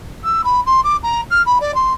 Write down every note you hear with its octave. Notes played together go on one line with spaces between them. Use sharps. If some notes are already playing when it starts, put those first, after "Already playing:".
E6
B5
C6
D6
A#5
F6
B5
D5
C6